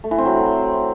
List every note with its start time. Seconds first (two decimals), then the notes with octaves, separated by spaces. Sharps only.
0.04 A3
0.11 E3
0.18 C4
0.26 F#3